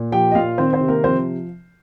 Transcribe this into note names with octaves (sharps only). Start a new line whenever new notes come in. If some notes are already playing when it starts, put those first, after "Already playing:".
Already playing: A#2
F3 G4 G5
D#5
A#2 F4 F5
D#3 C4 C5
C4 C5
C3
A#3 A#4
F3 C4 C5